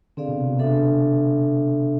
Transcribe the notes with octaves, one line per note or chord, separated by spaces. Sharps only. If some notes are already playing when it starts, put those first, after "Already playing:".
D3 C4 G#4 D5 F5
B2
C3
B2
C3 D4 A4 E5